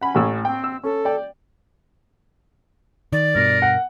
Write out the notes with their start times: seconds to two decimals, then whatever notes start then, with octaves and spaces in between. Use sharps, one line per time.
0.01 C#4 F#5 B5
0.15 A1 A2 E6
0.45 C4 G5
0.64 E6
0.83 C#4 A4
1.05 D5 G5
3.13 D#3 D5
3.36 G2 B2 A#4
3.62 F#5